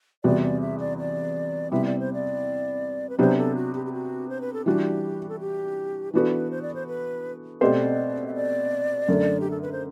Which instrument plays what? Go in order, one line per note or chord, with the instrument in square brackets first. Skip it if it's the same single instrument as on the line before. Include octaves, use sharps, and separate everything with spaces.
[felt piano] E2 C3 G3 B3 F#4 [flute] D5
[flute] D5
E5
D5
D5
[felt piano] C3 G3 B3 E4 [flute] E5
[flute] D5
C5
D5
B4
[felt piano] C3 F#3 B3 D4 G4 [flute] C5
[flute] A4
F#4
G4
G4
F#4
C5
B4
A4
[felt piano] E3 G3 D4 F#4 [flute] G4
[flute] A4
G4
[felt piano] E3 B3 D4 F#4 A4 [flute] B4
[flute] C5
D5
C5
B4
[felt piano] B2 A3 C4 G4 C5 [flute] D5
[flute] E5
D5
[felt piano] F#2 D3 A3
[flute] G4
A4
B4
C5